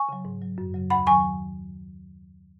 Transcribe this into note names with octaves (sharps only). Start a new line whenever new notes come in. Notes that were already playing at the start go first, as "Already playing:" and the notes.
Already playing: G#5 C#6
C#3 F#3
G#2
F#3
F#2
C#3 F#3
D#2 F#5 B5
D#3 F#3 G#5 C#6